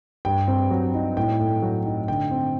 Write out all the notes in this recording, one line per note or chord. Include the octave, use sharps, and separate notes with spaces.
G2 G5
C4
F#3
D#4
A2 G5
A3
F#3
D#4
D3 G5
C4